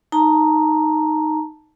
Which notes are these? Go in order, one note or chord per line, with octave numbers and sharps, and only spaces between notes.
D#4 A5 A#5